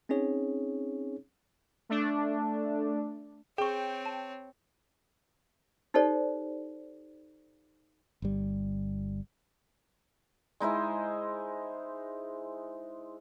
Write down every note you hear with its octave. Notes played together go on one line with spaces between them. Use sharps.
C4 C#4 D#4 G#4 C#5
A3 D4
C4 G#4 C#5 G5 C#6
A5
D#4 G4 A4 C5 D5
G1 G3
G#3 D#4 E4 C5